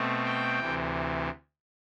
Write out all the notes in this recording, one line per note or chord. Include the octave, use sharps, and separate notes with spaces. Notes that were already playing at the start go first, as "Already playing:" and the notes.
Already playing: B2 A3 C4
G5
D2 C3 E3